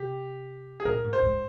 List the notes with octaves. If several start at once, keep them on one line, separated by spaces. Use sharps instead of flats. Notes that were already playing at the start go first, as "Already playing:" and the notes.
Already playing: C3 G4
G#4
A#2 A#4
G#2
C5
G#2